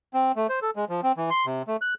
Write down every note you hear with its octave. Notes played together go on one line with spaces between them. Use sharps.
C4
A3
C5
A4
G#3
F3
C4
E3
C6
C3
A3
F#6